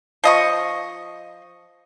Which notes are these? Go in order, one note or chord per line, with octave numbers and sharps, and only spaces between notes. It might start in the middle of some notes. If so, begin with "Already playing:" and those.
F3 D#5 C#6